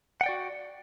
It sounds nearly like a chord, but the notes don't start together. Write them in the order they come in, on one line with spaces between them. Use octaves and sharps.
F#5 G5 D5 F#4